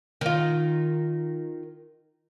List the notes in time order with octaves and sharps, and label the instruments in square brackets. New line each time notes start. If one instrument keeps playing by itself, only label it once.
[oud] D#3 F4